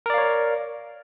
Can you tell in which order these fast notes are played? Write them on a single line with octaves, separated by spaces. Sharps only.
A#4 D5 F5 C#5